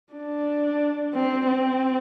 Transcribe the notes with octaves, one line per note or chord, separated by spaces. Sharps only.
D4
C4
C4